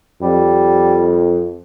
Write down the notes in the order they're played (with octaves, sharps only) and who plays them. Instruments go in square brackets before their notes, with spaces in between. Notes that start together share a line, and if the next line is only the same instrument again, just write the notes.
[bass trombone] F2 [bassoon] G3